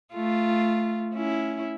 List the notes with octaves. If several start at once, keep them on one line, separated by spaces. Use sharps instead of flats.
A3 F4
C#4 E4